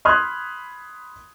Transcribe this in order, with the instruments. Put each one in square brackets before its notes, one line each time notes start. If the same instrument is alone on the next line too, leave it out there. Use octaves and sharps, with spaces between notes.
[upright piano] B5 C6 D#6 F6 F#6 G#6